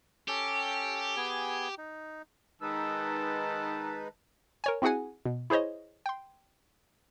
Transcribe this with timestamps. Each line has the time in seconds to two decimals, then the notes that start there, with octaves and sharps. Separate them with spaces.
0.28 C#4 G4 A4
1.17 B3 G#4 G#5
1.78 D#4
2.62 D#3 G#3 D#4 B4 A5 E6
4.64 A#4 C#5 G#5
4.82 C4 E4 F#4 G#4 F#5 G#5
5.26 B2
5.50 E4 G#4 C5 C#5 D#5
6.06 G5 C6